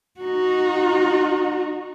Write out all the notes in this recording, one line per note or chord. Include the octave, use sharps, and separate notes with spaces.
D#4 F#4